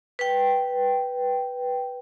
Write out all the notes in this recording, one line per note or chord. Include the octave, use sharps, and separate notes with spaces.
B4 G5